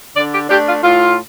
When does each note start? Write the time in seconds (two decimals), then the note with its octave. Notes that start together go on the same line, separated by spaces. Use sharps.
0.15 D3 D5
0.33 G4
0.49 A3 D4 G4
0.66 F4
0.82 A2 F4